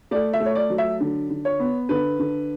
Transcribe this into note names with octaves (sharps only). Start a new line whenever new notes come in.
A3 D5
E5
A3
C#5
D5
F#3
E5
D3
D3
C#5
B3
D3 B4
D3